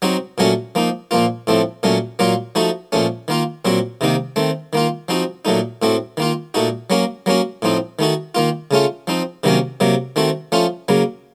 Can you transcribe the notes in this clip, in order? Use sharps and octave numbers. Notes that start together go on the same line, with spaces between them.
F#3 C4 D#4 F#4
A#2 F#3 A3 C#4 F#4
F3 A#3 D#4
A#2 F3 A#3 F4
A2 F3 A3 C4
A#2 F#3 A3 C#4
A#2 F#3 A#3 F4
F3 A3 D#4 F#4
A#2 F3 A3 C#4
D#3 A#3 F4
A#2 F#3 C4 F#4
C3 D#3 A#3 D#4
D#3 A3 C4
D#3 A#3 F4
F3 C4 D#4 F#4
A#2 F#3 A3 D#4
A2 A3 C4 F#4
D#3 A#3 F4
A#2 A3 D#4 F#4
F#3 A#3 C#4 F#4
F#3 A#3 C#4 F#4
A2 F3 C4 D#4
D#3 A3 D#4 F#4
D#3 A#3 F4
C#3 A3 C#4 F4
F3 C4 D#4
C3 D#3 F#3 A#3 C#4
C3 F#3 A#3
D#3 A3 C4 F#4
F3 A3 C#4 F4
C#3 F#3 A#3